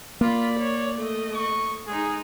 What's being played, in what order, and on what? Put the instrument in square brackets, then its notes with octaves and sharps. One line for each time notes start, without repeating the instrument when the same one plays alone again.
[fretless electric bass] A#3 [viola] F4 B5 [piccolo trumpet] D5
[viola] C#5
A3 D#5
[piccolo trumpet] C#6
[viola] G#3 D#4 [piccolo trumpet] G#4